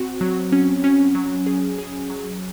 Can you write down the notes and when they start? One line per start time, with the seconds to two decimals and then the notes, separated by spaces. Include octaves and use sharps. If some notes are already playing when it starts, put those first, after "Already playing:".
Already playing: C4 F#4
0.21 F#3
0.52 C#4
0.84 C#4
1.15 F#3
1.47 G#4
1.78 G#4
2.10 F#3